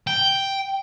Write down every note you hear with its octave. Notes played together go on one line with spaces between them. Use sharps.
G5